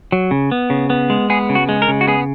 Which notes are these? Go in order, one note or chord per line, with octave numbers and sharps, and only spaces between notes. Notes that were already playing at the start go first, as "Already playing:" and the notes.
F#3
C#3
B3
C#3
B3
G#3
B3 G#4
C#3
F#4
G#3
A#4
C#3
F#4
B3 G#4